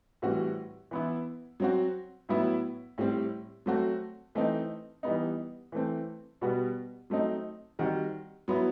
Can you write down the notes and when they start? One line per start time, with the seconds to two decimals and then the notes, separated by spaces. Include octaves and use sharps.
0.22 A2 E3 G3 C4 F#4
0.91 E3 B3 E4
1.60 F#3 C4 F#4
2.29 A2 F#3 B3 E4
2.98 A2 G3 C4
3.66 F#3 A3 C4 F#4
4.35 E3 A3 C4 D#4
5.03 E3 G3 B3 D#4
5.72 E3 A3 C4
6.41 B2 G3 B3 F#4
7.10 F#3 A3 C4 D#4
7.79 D#3 G3 C4 F#4
8.48 F#3 B3 E4